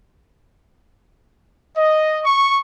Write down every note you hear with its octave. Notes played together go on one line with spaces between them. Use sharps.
D#5
C#6